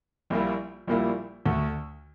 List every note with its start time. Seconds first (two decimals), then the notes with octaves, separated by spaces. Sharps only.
0.30 A#1 A#2 G3 A#3 E4
0.87 A#1 A#2 G3 A#3 E4
1.45 D2 D3 A3